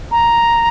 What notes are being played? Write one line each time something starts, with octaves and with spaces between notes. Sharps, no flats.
A#5